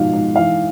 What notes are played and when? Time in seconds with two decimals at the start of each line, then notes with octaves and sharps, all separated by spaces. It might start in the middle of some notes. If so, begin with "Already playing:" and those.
Already playing: G#2 B2 F3 F5
0.13 G#2
0.36 E3 F5